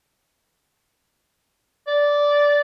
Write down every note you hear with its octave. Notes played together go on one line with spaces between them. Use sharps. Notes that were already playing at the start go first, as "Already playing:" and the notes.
D5